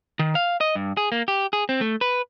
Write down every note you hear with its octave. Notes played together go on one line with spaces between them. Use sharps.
D#3
F5
D#5
G2
G#4
A#3
G4
G#4
C4
A3
B4